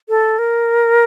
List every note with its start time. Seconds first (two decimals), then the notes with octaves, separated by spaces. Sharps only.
0.09 A4
0.39 A#4